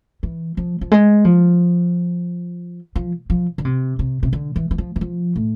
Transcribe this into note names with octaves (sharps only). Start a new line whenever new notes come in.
E3
F3
F3
G#3
F3
F3
F3
D3
C3
C3
C3
D3
E3
E3
F3
E3
F3
A2